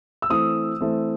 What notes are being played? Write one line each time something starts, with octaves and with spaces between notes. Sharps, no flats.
E6
E3 A3 C4 D#6
E3 A3 C4